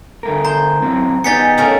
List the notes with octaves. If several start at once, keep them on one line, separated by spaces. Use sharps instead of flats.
D3 A3 A#4
C5 A#5
F#2 E3 C4
B3 D#4 G4 G#4 D5 A6 B6 C#7
C#3 A3 A#4